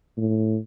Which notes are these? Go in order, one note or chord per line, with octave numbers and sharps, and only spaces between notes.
A2